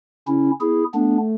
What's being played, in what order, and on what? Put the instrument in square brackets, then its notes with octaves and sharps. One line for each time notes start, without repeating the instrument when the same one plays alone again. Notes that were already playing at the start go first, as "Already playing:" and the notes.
[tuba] C#3 [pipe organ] C#4 E4
[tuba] B3 [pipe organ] E4 G#4
[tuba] A3 [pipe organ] B3 D4